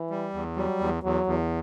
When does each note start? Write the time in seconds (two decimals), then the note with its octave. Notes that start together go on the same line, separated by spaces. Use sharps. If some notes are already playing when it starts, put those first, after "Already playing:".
Already playing: E3
0.10 G3
0.33 E2
0.56 F#3 G3
0.80 E2
1.03 E2 F#3
1.26 E2